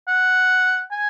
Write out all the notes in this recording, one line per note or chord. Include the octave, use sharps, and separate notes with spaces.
F#5
G#5